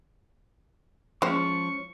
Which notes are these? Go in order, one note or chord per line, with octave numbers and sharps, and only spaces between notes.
F3 G#3 C#4 D4 C5 C#6